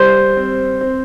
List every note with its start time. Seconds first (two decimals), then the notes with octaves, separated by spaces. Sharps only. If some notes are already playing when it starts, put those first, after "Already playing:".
Already playing: G3 C5
0.37 C4
0.81 C4